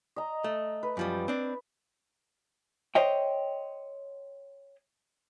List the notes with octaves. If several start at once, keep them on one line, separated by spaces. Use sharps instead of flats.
D#5 A#5
A3
B4
F#2 F3 G3
C4 D4
C5 C#5 D#5 E5 G5